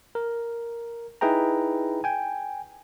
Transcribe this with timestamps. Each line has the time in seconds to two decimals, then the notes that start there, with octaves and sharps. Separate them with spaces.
0.15 A#4
1.21 D#4 E4 G#4 B4 G5 A#5
2.04 G5 G#5